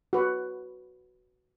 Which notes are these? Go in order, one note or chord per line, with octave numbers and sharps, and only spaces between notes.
F#4 B4